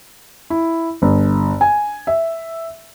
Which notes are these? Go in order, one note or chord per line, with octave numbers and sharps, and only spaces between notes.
E4
G1
G#5
E5